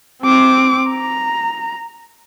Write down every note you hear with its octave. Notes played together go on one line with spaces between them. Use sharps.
C4 D6
A#5